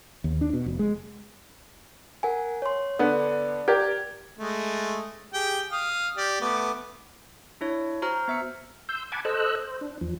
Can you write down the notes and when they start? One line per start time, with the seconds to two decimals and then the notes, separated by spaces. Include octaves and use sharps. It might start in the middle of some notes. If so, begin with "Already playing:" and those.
0.24 D#2
0.41 D4
0.53 B2
0.66 F1
0.79 G#3
2.23 A#4 F#5 G#5
2.62 C#5 C6
2.99 D3 B3 D5
3.68 G4 A#4 D5 G#6
4.38 G#3 A3
5.33 G4 G#4 G5
5.72 F5 D#6
6.17 G4 D5
6.41 A3 B3 D6
7.61 D4 E4 C#5
8.02 F#4 C5 A#5 F6
8.28 B3 E5 E6 C#7
8.89 C6 E6 G6
9.12 F#5 G#5 A5 B5 D6 G#6
9.25 A4 C5 D#5 E6 F#6
9.62 C5
9.81 D4
10.01 E2 F3